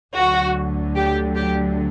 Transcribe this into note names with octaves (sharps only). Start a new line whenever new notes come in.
D2 D3 F#3 F#4
G4
G4